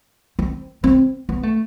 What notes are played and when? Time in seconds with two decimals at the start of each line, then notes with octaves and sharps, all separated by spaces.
0.39 C4
0.84 C4
1.29 B3
1.43 A3